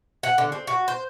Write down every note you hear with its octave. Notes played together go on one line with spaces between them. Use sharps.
F#5
D3
C4
F#4
C5